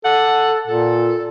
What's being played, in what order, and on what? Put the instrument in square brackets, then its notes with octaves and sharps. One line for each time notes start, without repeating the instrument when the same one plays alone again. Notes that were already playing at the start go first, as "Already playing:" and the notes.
[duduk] A4 [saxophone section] D5 F#5
[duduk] A#2 [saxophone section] A4